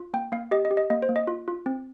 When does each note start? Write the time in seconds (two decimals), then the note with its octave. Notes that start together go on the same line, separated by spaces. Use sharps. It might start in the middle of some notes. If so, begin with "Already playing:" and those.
Already playing: F4
0.14 A#3 G5
0.32 A#3 F5
0.51 G4 D#5
0.65 D#5
0.71 G4
0.77 D#5
0.90 A#3 D#5
1.02 C5
1.09 A#3
1.16 D#5
1.27 F4
1.48 F4
1.66 C4